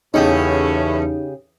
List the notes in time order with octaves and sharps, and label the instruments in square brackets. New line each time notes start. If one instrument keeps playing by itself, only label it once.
[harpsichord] E2 A3 [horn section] A2 C#4 [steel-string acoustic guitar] C#3 G4 G#4 [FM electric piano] D#4